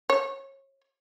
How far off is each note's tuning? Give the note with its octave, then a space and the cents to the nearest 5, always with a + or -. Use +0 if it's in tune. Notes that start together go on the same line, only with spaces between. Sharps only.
C#5 -30